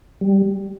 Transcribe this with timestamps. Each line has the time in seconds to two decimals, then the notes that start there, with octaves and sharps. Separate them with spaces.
0.21 G3